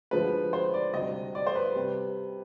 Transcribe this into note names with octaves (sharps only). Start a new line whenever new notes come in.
D2 D3 F3 G#3 B4
C5
D5
D2 C3 G3 D#5
D5
C5
B4
C3 G3